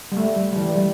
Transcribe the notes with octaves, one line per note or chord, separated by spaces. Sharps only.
G3
A3
G3
G3
E3
G3